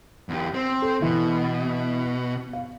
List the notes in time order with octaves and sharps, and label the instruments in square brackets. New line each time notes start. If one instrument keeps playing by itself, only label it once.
[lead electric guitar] E2 G4
C4
[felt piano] A4
[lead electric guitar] B2 [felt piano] E3
[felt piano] F5